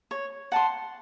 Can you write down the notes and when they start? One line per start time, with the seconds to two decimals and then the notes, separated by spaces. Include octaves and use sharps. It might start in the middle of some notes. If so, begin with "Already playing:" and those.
0.11 C#5
0.52 F#5 A5 C6